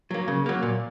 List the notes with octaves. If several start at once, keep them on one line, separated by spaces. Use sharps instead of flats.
F#3 A#3
C#3
F#3 A#3
A#2